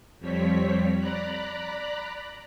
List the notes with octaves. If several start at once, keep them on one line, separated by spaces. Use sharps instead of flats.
F2 F3 G3 C4 C#5 B6
D5 A#5 B5 F#6